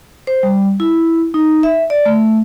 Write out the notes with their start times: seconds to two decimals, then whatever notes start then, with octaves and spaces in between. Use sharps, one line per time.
0.27 C5
0.43 G3
0.80 E4
1.34 D#4
1.63 E5
1.90 D5
2.06 A3